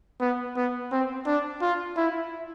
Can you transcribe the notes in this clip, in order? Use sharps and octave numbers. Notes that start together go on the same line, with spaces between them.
B3
B3
C4
D4
F4
E4